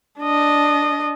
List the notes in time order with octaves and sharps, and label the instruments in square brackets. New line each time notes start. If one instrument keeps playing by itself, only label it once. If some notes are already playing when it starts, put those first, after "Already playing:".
[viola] D4 D#5